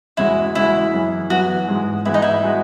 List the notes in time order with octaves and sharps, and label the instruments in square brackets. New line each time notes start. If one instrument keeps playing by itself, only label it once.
[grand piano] E2 C#3 G#3 C#4 F#4 [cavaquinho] E4
[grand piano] E2 C#3 G#3 C#4 F#4 [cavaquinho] E4
[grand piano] F#2 E3 B3
[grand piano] F#2 E3 B3 [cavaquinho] F#4
[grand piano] G#2 E3 G#3 B3
[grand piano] G#2 E3 G#3 B3 [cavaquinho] E4
[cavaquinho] D#4
E4
[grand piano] G#3 B3 F#4